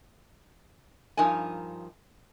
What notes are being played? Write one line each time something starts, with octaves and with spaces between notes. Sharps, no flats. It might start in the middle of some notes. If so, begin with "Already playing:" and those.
G2 F3 D#4 A#4 G#5